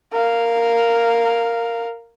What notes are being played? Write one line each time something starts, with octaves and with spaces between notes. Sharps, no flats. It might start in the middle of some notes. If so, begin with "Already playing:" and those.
A#4 F5